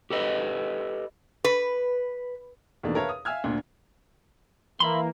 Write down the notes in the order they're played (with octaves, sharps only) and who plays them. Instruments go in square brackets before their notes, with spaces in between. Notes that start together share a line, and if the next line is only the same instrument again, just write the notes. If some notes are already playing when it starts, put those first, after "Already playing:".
[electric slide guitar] G4 A4 B4 D#5
[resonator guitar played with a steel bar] B4
[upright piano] E2 B2 D#3 A3 A#3 D4
A#4 B4 C#5 E5 F5 A5
D#6
E5 F5 G#5 E6 F6 G#6
D2 A#2 D4
[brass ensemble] E3 A#3 [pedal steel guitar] E5 B5 C6